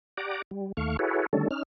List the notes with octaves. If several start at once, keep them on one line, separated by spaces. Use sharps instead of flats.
G4 D5 F#5 A#5 D6
G3
D#2 A3 F5 C#6
E4 F#4 G#4 A4 B4 C#5
D3 D#3 G3 A3 C#4 A4
C#4 D#4 F6